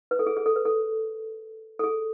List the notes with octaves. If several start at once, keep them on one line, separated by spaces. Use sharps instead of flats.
B4
A4
G#4
G#4
A4
B4
A4
A4
G#4